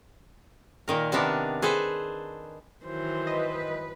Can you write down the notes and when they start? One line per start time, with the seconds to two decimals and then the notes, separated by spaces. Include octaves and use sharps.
0.88 A#2 D#3 A#4
1.12 C3 D#3 B3 D4 A#4
1.62 G#4 A4 B4 C5
2.84 D#3 E3 F#3 C5
3.27 B4 D#5